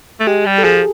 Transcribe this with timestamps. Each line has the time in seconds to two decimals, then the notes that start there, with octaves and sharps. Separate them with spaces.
0.20 A3
0.27 G#3 G4
0.46 G3
0.58 A4
0.64 F3 G#4